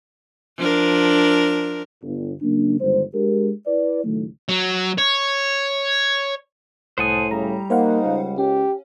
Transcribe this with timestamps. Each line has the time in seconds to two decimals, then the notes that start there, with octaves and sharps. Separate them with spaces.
0.58 F3 D4 A#4
2.03 G1
2.42 C#3 F#3 A#3 D4
2.81 G1 G2 D#3 G#3 C5
3.15 G#3 D4 G4 A#4
3.67 E4 B4 D5
4.05 C#2 A2 D#3 F#3 A3
4.49 F#3
4.98 C#5
6.98 C2 A2 C5 F#5 G#5 A5 D#6
7.31 C#3 G3 A#5
7.70 A#3 D#4 C5 F5 F#5
8.06 C#2
8.38 C#4 G4